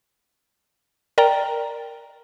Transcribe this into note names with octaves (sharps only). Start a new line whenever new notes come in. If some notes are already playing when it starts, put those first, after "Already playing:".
A#4 D5 G5 A#5